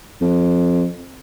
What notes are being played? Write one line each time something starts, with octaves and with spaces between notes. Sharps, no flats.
F2